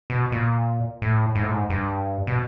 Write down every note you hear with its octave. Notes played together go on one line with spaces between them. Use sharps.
B2
A#2
A2
G#2
A2
G#2
G2
B2